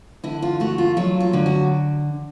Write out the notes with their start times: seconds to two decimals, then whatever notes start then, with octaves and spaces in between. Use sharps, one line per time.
0.24 D3 E4
0.42 F4
0.60 A3 F#4
0.78 F4
0.97 F#3 F4
1.21 F4
1.33 D3
1.46 F#4